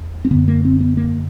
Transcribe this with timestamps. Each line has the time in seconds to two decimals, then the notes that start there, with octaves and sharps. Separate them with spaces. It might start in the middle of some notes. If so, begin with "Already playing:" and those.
Already playing: E2
0.25 C4
0.31 F#2 D3 B3
0.48 A#3
0.65 C4
0.81 B3
0.97 A#3